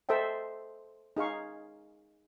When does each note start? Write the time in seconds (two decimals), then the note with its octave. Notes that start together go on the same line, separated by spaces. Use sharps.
0.09 A4 C5 D#5 E5 G5
1.17 D#4 G#4 F5 C#6